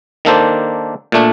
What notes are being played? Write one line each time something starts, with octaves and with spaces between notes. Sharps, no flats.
D#3 A#3 D4 A4 C5
A#2 A3 D4